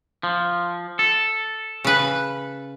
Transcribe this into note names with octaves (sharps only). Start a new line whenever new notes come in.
F3
A4
C#3 B4